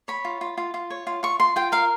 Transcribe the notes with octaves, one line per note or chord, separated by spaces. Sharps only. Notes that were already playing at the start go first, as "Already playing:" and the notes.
C#5 B5
F4
F4
F4
F4
C#5
F4
F4 C#6
F4 C6
F4 G5
A#4 F5